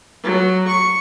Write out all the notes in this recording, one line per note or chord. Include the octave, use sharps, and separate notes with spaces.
F#3
C#6